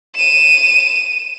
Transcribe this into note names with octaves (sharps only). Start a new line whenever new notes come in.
D#7 E7